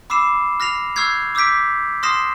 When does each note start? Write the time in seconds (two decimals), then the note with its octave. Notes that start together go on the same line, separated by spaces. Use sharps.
0.10 B5 D6 E6 C7 E7
0.60 F6 A#6 C7 F7
0.96 C#6 E6 F6 G6 G#6 C7
1.35 D6 E6 F6 G6 B6 D7
2.03 C6 D#6 F6 A#6 C7 E7